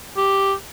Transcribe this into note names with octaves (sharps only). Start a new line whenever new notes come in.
G4